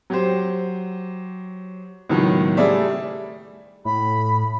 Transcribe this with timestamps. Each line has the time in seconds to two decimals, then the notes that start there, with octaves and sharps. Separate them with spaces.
0.10 F#3 G4 C5
2.09 C#2 A2 D#3 F#3 B3
2.57 G3 A3 G#4 D5 E5
3.85 A2 B5